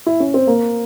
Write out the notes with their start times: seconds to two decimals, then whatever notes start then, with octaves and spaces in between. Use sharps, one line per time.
0.06 E4
0.20 C#4
0.34 C4
0.47 A#3